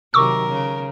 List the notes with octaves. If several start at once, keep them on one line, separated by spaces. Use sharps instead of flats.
C3 D#3 F#3 A#4 C#6 D6 E6
C#3